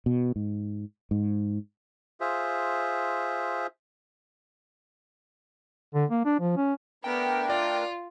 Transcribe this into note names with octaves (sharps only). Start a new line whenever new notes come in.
B2
G#2
G#2
F4 G#4 C5 E5
D3
A#3
D4
F3
C#4
A3 B3 D4 A#4 G5
F4 D5